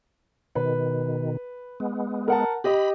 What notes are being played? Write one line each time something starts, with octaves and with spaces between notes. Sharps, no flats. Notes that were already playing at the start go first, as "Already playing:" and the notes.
B2 D#3 B4
G#3 B3
A#4 F#5 A5
G4 D#5 B5